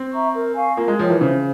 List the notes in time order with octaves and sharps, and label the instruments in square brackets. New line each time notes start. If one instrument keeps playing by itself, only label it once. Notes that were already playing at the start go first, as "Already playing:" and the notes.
Already playing: [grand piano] C4
[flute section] E5 A#5 C#6
A#4
F5 G#5 C#6
[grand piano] A#3 [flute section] F4
[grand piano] G#3
[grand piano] F3 [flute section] A#4 C#5 G5
[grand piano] E3
[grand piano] C#3 [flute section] C5